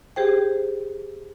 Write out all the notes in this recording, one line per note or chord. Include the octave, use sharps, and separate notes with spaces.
G4 G#4 C5 G5